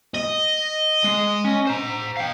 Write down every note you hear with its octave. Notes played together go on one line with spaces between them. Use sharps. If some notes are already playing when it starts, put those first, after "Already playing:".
D#5
G#3
C#4
C5 A#5
F5 G5